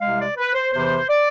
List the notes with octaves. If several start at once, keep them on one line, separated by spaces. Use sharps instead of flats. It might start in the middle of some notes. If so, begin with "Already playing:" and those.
C2 C3 G#3 F5
D5
B4
C5
E2 C3 E3 C5
D5